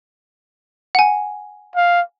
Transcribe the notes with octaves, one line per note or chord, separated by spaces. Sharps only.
F#5 G#5
F5